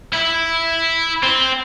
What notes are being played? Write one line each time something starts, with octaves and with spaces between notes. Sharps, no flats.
E4
C4